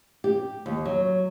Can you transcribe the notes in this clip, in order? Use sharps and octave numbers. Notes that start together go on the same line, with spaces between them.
G4
D#2
F#3